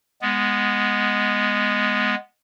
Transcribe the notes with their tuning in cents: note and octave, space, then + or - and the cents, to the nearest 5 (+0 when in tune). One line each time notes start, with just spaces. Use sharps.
G#3 -5 B3 +0